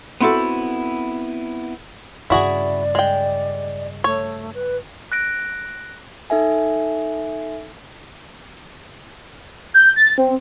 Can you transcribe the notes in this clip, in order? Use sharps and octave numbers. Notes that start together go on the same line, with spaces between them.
B3 C4 E4 F#4 A4
G2 C#3 E4 F#4 G#4 D5
G#3 G5
A3 C#5
B4
F#6 A#6 D7
D#4 A4 E5 G#5
G6
A6
C4